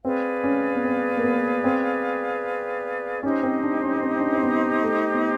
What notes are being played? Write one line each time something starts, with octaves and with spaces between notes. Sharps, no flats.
C4 G#4 B4 D5 F5
C#4
B3
C4
A#3
B3
C4
C#4 D#4 G4 C5 D#5
C4
D4
C#4
C4
D4
C#4
C4
B3
A3
B3